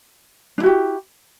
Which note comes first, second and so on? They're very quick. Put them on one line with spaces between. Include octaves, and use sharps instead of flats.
D4 E4 F#4 G4